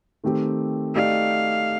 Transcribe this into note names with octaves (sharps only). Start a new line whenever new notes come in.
D#3 A3 C4 G4
A3 D#4 G4 D5 F5